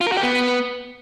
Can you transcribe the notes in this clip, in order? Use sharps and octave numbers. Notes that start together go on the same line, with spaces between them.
F4
A#4
F#4
G4
B3